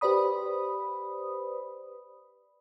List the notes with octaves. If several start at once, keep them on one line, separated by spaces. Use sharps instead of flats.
G4 B4 C5 D5 B5 D#6